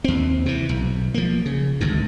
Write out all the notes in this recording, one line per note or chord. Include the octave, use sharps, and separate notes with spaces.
D#2 C4
C3 E3
B1
F3 A#3
C#3
G#1 D2 G2